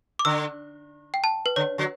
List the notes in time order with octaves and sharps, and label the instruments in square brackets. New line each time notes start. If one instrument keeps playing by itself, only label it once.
[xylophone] D6
[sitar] D3 [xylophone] E6
[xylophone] G5
A5
B4
[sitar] D3 [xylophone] C#5
[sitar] D3 F#3